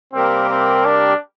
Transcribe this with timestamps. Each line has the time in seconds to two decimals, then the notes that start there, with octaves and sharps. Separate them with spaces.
0.13 C3 G3 A#3 C4 G4 A#4
0.49 C4
0.85 D4